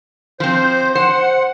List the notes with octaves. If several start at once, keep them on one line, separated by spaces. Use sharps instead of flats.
F3 C4 C5
C5 F#5